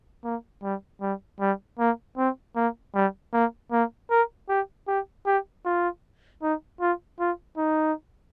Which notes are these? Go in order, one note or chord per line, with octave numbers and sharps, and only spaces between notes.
A#3
G3
G3
G3
A#3
C4
A#3
G3
A#3
A#3
A#4
G4
G4
G4
F4
D#4
F4
F4
D#4